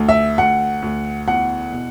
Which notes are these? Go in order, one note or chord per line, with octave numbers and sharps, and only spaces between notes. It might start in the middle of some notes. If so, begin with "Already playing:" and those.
Already playing: D2
E5
D2 F#5
D2
E2 F#5
B2